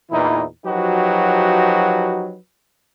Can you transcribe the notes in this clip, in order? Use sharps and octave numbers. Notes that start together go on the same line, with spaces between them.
E2 A#2 E3 D#4 E4
F3 F#3 D#4 F#4 G4 B4